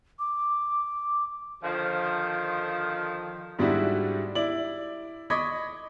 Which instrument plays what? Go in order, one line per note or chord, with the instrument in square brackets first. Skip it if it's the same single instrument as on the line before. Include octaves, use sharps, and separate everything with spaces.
[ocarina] D6
[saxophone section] D3 D#3 F3
[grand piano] G#2 G3 D4 E4 F#4
E4 D5 F#7
D#5 B5 C#6 D6 G#6 B6